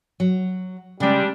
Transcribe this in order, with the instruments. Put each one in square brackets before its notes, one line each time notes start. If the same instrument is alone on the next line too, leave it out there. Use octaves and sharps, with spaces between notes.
[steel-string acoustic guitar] F#3
[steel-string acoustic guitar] C#3 G#3 [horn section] G3 D4